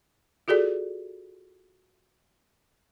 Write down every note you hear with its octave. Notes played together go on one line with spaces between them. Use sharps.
F4 F#4 G#4 A4 D5